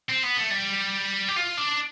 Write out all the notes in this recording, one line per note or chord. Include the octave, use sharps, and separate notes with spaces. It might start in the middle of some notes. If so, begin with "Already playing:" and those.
C4
B3
A3
G3
G4
F4
D4